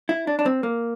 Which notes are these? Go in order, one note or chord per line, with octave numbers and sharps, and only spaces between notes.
E4
D4
D4
C4
A#3